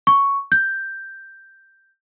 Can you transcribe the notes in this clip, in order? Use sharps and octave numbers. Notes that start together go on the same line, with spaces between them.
C#6
G6